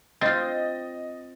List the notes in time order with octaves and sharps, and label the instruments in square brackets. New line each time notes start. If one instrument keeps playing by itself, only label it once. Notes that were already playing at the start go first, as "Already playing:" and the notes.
[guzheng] C4 F4 [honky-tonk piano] D#5 A6